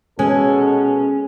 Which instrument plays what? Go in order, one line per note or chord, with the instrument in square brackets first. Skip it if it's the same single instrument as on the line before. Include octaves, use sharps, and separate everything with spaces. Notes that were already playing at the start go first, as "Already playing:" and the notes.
[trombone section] B2 A4 [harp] G#3 [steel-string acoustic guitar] C#4